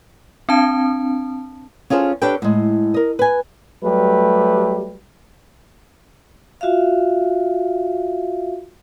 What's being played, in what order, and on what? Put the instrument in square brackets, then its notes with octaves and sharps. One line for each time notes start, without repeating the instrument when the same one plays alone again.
[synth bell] C4 D4 A5
[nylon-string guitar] C#4 F4 G#4 A4 C5
D4 G4 A4 B4 C#5 G5
A2 G#3
A#4 D#5
B4 G#5
[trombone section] F#3 G3 A3 G4 B4
[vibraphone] F4 F#4 E5 F5